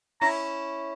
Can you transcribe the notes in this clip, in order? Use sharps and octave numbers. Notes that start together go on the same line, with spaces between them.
C#4 E4 A#5